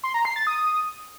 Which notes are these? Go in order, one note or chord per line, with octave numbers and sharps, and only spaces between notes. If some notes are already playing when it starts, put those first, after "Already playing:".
C6
A#5
C7
A6
D#6